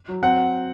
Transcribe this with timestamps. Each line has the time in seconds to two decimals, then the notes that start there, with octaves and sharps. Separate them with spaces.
0.08 F#3
0.23 C4 F#5